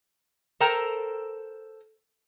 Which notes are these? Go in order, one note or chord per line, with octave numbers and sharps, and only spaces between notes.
A4 A#4 C5 G5 A#5